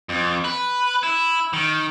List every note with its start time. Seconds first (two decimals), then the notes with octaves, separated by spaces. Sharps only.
0.09 F2
0.44 B4
1.03 E4
1.53 D#3